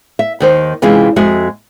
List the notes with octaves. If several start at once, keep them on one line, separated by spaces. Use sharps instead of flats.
E5
D#2 D#3 C5
C3 E3 G#3 C#4 F4
F2 G#3 F#4 E5